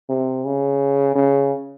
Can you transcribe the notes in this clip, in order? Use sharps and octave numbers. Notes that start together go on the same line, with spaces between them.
C3
C#3
C#3